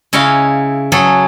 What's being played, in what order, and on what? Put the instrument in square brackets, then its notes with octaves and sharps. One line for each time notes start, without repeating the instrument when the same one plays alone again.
[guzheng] C#3 E4 C#5 D#5 F5 G#5
F#3 G#4 A4